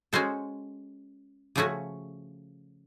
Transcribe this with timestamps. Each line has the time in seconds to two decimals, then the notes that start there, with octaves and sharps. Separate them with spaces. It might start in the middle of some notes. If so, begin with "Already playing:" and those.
0.13 G#3 C#4 F#4 A4 C5
1.56 C#3 F3 A3 C#4 F#4